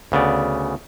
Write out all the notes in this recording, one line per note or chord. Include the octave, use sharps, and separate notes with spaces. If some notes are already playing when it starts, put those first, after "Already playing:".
D2 C#3 B3 D5